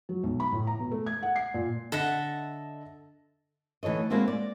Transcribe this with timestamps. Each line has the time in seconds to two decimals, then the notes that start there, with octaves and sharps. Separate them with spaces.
0.09 F#3
0.23 B1
0.40 B5
0.52 A2
0.67 A#5
0.79 B2
0.91 A3
1.06 G#6
1.23 F#5
1.36 C7
1.54 A#2
1.92 D3 A4 D#5 E5 F#5 A#6
3.83 D2 E3 A4 C#5 D#5
4.10 G#3 A#3 C4 E4 F#4 G4
4.28 D5